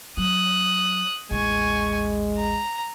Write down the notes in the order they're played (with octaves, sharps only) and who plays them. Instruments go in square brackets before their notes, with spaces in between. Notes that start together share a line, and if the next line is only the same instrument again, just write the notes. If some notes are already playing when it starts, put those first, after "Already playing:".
[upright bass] F#3 [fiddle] D#6 F#6
[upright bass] A1 D#2 [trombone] G#3 [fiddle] G#5 C#6
[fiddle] A#5